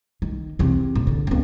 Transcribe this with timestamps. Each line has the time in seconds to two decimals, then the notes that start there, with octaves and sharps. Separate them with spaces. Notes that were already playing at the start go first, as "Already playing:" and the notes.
0.22 D#3
0.59 E2 C3
0.95 A#2
1.07 D3
1.27 C#2 B3